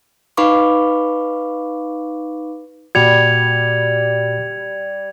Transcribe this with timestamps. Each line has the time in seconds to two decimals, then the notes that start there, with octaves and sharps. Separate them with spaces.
0.37 D#4 B4 F5 B5 C#6 D6
2.95 A#2 G3 F#4 G#6 C#7 F7